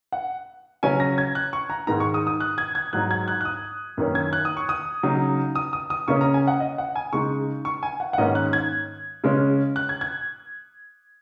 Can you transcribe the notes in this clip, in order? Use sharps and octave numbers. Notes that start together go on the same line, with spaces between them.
F#5
C#3 F#3 C#4 G#5
A#6
G#6
F#6
C#6
A#5
G#2 D#3 G#3 D#4 A#5
C#6
D#6
D#6
F#6
G#6
G#6
G#2 F#3 D#4 F#6
G#6
F#6
F#6
D#6
F#2 D#3 A#3 C#4
G#6
F#6
D#6
C#6
D#6
C#3 F#3 D#4
D#6
D#6
D#6
C#3 A#3 C#4 C#6
A#5
G#5
F#5
D#5
F#5
G#5
C#3 G#3 D#4 C#6
C#6
G#5
F#5
F#5
G#2 D#3 A#3 C#4 D#5
F#6
G#6
C#3 G#3 C#4
F#6
G#6
G#6